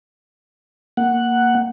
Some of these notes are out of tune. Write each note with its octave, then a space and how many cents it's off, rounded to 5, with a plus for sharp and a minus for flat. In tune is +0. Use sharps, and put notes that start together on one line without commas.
A#3 -5 F#5 +0